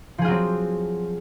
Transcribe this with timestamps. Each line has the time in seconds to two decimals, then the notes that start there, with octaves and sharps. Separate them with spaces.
0.18 F3
0.22 G#4
0.25 F4
0.28 F#3
0.31 C4